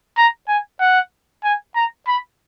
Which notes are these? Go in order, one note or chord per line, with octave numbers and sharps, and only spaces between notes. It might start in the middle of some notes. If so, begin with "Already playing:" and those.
A#5
G#5
F#5
G#5
A#5
B5